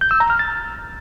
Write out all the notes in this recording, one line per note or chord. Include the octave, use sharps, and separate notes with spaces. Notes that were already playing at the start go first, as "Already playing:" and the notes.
G6
E6
A#5
F6
A6